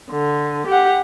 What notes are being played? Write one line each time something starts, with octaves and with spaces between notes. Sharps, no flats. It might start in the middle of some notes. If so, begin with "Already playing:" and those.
D3
G4 F#5